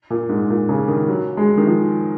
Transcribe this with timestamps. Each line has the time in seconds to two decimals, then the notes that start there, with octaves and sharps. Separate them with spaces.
0.10 A#2
0.29 G#2
0.50 A#2
0.69 C#3
0.88 D#3
1.08 F#3
1.37 G#3
1.57 D#3
1.67 F3